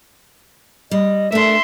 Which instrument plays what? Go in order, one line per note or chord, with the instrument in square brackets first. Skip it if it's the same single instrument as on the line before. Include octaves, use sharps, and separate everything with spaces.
[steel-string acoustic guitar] G3 [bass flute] D#5
[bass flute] A3 [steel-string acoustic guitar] D4 A#4 [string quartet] E5 C6